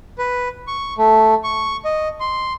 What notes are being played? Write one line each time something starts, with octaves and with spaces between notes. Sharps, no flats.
B4
C#6
A3
C#6
D#5
C6